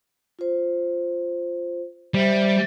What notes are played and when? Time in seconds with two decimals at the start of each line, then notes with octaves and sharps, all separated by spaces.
0.39 F4 C5
2.14 G3 C5 E5